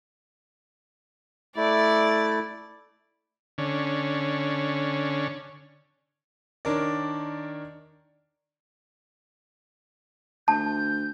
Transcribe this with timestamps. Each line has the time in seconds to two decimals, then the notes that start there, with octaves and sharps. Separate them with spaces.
1.56 A3 E4 D5 A6
3.58 D3 C#4
6.65 D#3 D4 A#4 C#5 D5
10.48 D2 A5 G6